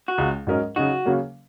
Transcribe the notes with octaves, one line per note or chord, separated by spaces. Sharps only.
F#4
C#2 C#3 G#3
G#2 F#3 C#4 A#4 D#5
C#3 F#3 D#4 F#4
C#3 F#3 A#3 C#4